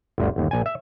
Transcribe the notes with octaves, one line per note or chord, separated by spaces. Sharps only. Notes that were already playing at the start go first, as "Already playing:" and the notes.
G1 D2
G1 D#2
A#1 G#5
E5